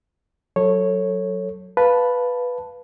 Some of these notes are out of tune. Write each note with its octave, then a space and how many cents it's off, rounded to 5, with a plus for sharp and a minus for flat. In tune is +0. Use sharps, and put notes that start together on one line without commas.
F#3 +0 A4 +20 C#5 -10
B4 +0 F5 +0 A5 +0